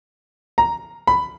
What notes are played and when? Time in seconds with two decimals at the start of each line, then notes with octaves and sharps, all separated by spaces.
0.58 A#5
1.07 B5